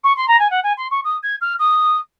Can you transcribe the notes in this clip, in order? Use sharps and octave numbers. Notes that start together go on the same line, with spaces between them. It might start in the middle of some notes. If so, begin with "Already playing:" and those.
C#6
C6
A#5
G#5
F#5
G#5
C6
C#6
D#6
G#6
F6
D#6